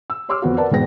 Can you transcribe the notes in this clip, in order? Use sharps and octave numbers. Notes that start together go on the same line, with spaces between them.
E6
G4 C#5 C6 D6 E6 F6
F2 B3 F#4
A#4 B4 D5 F#5 A5
E1 G#2 B3 G#4 G5 A#6